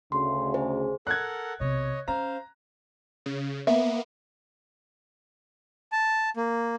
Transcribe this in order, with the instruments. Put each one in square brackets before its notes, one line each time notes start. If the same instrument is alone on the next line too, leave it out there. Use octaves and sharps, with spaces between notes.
[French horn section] D2 C#3 [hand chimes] C6
[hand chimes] G#4 C5
[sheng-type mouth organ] A4 A#4 F#5 [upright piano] F#6 G#6
[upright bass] B1 C3 [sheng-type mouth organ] C#5 D#5
[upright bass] C#4 [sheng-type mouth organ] C5 F5 [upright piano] A#5
[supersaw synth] C#3
[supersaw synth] A#3 B3 [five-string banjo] E5
[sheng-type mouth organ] A5
A#3